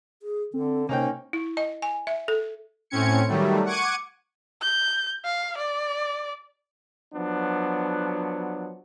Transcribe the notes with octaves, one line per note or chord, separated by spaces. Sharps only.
G#4
D3 C4 A4
C3 A#3 C#4 D#4 C5 G5
E4
D#5
G#5
E5
A4
A2 C4 C#4 G#6 C#7
D#3 F#3 G3 A3
F#5 C#6 D6 G#6 C#7 D#7
G6
F5
D5
F3 F#3 B3 D4